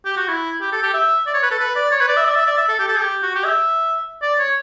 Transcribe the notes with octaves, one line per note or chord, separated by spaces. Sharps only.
G4
F#4
E4
G4
A4
G4
E5
D5
C#5
B4
A4
B4
D5
C#5
B4
D5
E5
D5
E5
D5
E5
A4
G4
A4
G4
F#4
G4
E5
D5
C#5